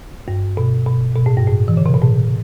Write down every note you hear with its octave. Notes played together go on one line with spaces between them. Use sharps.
G2
B2
B2
B2
A2
G2
A2
E3
D3
C3
B2
A2